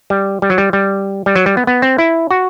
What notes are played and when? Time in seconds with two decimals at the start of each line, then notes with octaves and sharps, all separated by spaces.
0.10 G3
0.42 G3
0.50 F#3
0.58 G3
0.73 G3
1.26 G3
1.36 F#3
1.46 G3
1.57 B3
1.67 B3
1.82 C4
1.98 E4
2.31 F#4